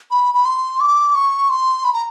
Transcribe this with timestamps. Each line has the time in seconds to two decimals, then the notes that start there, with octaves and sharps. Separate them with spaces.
0.11 B5
0.34 B5
0.45 C6
0.80 D6
1.15 C#6
1.50 C6
1.85 B5
1.93 A#5